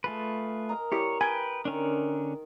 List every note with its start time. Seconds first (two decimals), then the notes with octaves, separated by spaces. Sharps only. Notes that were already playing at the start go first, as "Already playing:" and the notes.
0.04 A3 F4 G#4 B4 A5
0.69 A#4 D#5 A#5
0.92 E4 G4 C#5
1.21 B4 G5 G#5
1.65 D3 D#3 C#4 D4